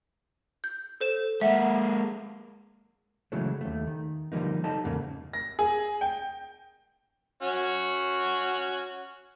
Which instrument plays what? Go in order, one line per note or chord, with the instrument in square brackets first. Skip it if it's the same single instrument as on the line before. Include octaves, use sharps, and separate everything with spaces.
[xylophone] G6
A4 C5 E7
[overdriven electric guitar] G#3 A#3 [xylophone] E5 F#5
[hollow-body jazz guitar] C#3 E3 F#3 G#3 A3
D#2 A3
D#3
D3 F3 G3 A#3 D#4
D#4 G4 A4 D#5 A5
E2 G#2 C#3 A#3
[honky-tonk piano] A#6
G#4
G5
[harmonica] C#4 F#4 C#5